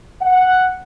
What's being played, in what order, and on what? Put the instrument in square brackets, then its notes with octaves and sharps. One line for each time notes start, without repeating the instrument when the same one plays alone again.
[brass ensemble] F#5